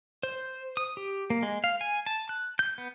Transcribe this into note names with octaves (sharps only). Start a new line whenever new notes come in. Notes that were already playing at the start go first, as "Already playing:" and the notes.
C5
D#6
G4
A#3
G#3
F5
G#5
A5
F#6
G6
B3